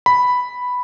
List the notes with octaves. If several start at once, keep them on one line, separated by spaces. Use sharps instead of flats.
B5